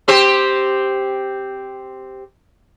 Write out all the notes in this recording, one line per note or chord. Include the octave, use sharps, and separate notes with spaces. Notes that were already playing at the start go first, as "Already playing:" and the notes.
C4 G4 C5